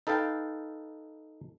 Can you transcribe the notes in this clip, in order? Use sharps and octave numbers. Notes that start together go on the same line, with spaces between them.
D#4 A4 B4 F5 G5